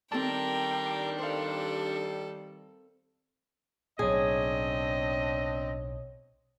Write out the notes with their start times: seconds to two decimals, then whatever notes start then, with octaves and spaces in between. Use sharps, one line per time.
0.12 D#3 G3 C4 D4 A4 A#4 G5 A5
1.19 A4 C5 F5
3.99 B1 A2 C4 D4 G#4 C#5 D#5 D#6